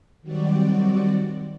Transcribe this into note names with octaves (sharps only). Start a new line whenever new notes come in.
D#3 F#3 G3 C4 F#4 D5